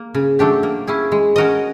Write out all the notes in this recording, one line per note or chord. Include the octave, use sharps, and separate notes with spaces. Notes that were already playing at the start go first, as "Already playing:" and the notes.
Already playing: A#3
C#3
F#3 A3 D4 G4
A#3
C#4 E4 G#4
G#3
C#4 F#4 A#4 D#5